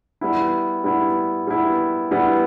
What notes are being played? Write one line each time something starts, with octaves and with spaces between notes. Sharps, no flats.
G3 B3 E4
G3 B3 E4
G3 B3 E4
G3 B3 E4